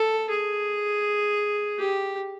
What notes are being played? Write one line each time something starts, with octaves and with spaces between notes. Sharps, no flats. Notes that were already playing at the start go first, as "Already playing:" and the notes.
Already playing: A4
G#4
G4